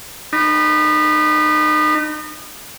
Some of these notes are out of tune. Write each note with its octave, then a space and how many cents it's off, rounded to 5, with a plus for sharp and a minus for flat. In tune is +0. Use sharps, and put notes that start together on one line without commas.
D#4 -35 B5 -10